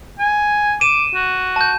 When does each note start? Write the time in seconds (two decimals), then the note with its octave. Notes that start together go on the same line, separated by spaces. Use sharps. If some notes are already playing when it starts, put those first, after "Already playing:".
0.19 G#5
0.81 D6 D#7 E7
1.14 F#4
1.56 A5 G6